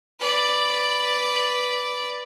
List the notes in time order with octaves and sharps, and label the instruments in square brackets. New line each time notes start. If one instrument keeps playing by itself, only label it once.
[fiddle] B4 D5